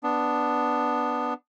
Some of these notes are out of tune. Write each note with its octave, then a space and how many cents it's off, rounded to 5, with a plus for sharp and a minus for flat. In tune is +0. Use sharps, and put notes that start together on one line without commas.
B3 +0 D4 +0